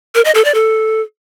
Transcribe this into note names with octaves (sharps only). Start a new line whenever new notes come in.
A#4
D#5
A4
D5
A4